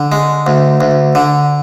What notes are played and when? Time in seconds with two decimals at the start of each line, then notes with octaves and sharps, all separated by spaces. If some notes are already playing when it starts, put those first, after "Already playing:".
Already playing: D3
0.12 G#3
0.47 D2
0.81 D2
1.15 D3